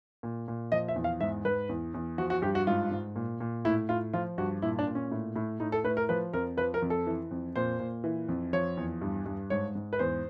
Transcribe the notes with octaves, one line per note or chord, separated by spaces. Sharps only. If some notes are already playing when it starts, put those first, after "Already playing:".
A#2
A#2
F3 D#5
E5
E2
F5
G#2 E5
G#2 B4
E2
E2
F3 F#4
F#4
G2 G4
F#4
G#2 F4
G#2
A#2
A#2
A2 E4
A2 F4
F3 F4
G2 F#4
A#2 E4
D4
A#2
C#4
A2
A2
A2 D#4
A4
A2 B4
A#4
F3 B4
F2 A#4
F3 B4
A#4
F2
A4
E3
F2
A#2 C5
A#2
E3
F2
F3 C#5
E2
G2
G2
G#2 C#5
G#2
B4
E2 C5